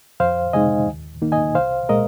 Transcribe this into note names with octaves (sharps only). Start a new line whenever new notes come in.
F2 C5 F5
C3 G#3 D#4 D#5 G#5
D#2
D#3 A#3 D#4
D#5 G#5
C2 C5 F5
A#2 G#3 A#4 D#5